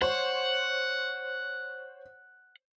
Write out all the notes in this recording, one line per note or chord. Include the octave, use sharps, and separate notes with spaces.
C5 C#5 F#5